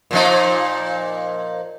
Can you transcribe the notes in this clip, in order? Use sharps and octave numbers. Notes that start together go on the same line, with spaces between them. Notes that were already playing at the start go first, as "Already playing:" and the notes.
A#2 F3 D#4